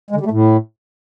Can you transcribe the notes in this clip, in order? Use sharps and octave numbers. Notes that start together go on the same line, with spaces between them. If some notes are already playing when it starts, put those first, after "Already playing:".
G#3
D3
G3
A3
A2